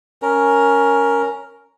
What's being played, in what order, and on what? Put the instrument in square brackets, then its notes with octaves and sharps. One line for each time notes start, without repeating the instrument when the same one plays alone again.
[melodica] C#4 A#4